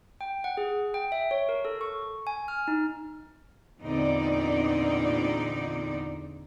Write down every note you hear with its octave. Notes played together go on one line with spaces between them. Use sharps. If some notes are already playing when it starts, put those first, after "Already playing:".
G5
F#5
G#4
G5
E5
C#5
A#4
A4
C#6
G#5
F6
D#4
E2 A#2 D3 C4 D#4 D5